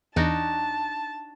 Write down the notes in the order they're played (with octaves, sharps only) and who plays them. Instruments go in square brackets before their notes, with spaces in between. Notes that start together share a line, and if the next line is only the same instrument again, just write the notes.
[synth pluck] E2 [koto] D4 D#4 F#4 [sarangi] A5